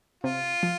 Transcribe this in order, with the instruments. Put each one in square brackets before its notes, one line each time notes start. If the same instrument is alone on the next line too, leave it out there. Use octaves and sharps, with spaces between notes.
[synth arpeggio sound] C3 [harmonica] F4
[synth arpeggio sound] F3